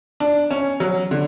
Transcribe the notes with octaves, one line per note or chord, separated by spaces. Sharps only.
D4
C#4
F#3
D3